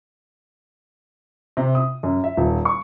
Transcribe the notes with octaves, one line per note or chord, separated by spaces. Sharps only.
C3
D#6
F#2
E5
D#1
C#6